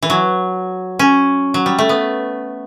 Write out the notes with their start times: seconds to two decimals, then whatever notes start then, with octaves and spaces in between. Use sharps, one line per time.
0.03 E3
0.10 F#3
0.99 C#4
1.54 F#3
1.66 G3
1.79 A3
1.89 B3